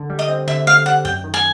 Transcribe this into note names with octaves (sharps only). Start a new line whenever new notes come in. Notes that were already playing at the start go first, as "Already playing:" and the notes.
Already playing: D3
G3
D#5
C4
D3 E5
D3 F5
G3 F#5
F#2 G5
D#3
G#5